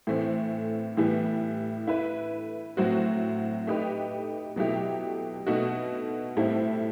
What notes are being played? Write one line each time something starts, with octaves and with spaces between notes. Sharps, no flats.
A2 E3 A3 C4
A2 E3 G3 B3
A3 E4 B4
A2 F#3 C4 F#4
A3 D#4 G4 B4
B2 F#3 A3 E4 G4
B2 A3 D#4 F#4
A2 G3 C4 E4 A4